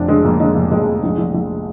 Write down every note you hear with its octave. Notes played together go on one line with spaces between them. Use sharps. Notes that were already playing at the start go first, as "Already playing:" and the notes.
Already playing: F1 F2 C4 D4
D3 G#3
F2 A#3
D3 G#3
F1
F2 G#3
F1
A#1 G#3
A#1
A#1